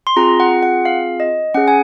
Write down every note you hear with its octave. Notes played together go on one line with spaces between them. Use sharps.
C6
C4 F4 G#4 A#5
F#5
F#5
F5
D#5
C#4 G#4 F#5
G#5